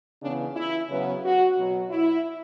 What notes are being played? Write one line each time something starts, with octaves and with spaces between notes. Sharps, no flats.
C#3 E3 B3 D4
E4
C#3 F#3 B3
F#4
B2 F#3 B3
E4